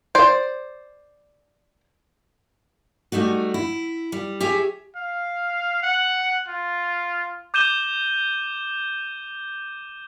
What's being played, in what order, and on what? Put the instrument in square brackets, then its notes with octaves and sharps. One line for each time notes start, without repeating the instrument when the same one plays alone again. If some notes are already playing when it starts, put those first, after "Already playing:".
[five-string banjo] C5 D5
[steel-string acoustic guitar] G3 A3 D#4 F#4
E4
G3
G4 G#4 C#5 E5
[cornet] F5
F#5
F4
[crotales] D6 G6 D#7 E7 G7